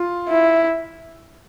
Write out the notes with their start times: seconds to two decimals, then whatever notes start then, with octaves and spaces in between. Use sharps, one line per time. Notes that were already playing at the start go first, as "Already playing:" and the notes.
Already playing: F4
0.29 E4